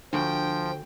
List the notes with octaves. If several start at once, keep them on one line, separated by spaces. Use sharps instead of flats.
D2 F3 D4 F4 G5 C#6